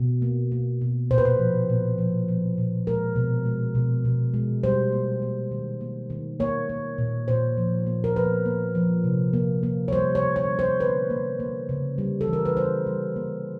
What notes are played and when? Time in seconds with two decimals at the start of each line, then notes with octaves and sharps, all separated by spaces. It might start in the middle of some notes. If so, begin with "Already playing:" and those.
Already playing: B2
0.22 A#3
0.52 A#3
0.81 B2
1.11 A#2 C5
1.18 B4
1.25 C5
1.39 F3
1.69 A#2
1.98 F3
2.28 F3
2.58 A#2
2.87 G#3 A#4
3.16 B2
3.45 G#3
3.75 B2
4.05 B2
4.34 G#3
4.64 G3 C5
4.92 A#3
5.22 A#3
5.51 D#3
5.81 A#3
6.10 D#3
6.40 A#3 C#5
6.69 A#3
6.98 A#2
7.28 A#2 C5
7.57 F3
7.87 A#3
8.04 A#4
8.16 F3 B4
8.46 A#3
8.75 F3
9.04 C3
9.33 A#3
9.63 A#3
9.88 C#5
9.92 G3 C5
10.15 C#5
10.22 D3
10.36 C#5
10.51 G3
10.59 C5
10.80 D3 B4
11.10 A#3
11.40 A#3
11.69 C#3
11.98 G3
12.21 A4
12.27 E3
12.33 A#4
12.45 B4
12.57 G3 C5
12.86 G3
13.16 A#3